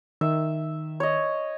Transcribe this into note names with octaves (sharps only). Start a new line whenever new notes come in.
D#3 E5
C#5 D#5